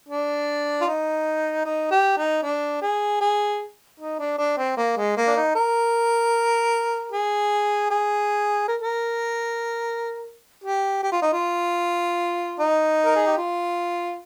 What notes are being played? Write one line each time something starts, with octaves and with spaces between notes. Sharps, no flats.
D4
F4
D#4
D#4
G4
D#4
D4
G#4
G#4
D#4
D4
D4
C4
A#3
G#3
A#3
D4
D#4
A#4
G#4
G#4
A#4
A#4
G4
G4
F4
D#4
F4
D#4
A#4
G#4
G4
F4